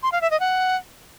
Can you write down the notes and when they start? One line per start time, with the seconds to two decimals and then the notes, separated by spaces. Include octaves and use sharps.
0.03 C6
0.12 F5
0.21 E5
0.31 D#5
0.40 F#5